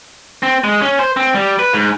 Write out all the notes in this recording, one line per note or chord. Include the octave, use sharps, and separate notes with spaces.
C4
G#3
C#4
C5
C4
G3
B4
G#2